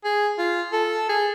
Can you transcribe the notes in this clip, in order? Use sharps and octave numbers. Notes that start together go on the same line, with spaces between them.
G#4
F4
A4
G#4